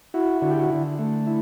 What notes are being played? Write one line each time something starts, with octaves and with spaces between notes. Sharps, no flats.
E4 F#4
D3 F#4
G4
F#4
D3
A3
E4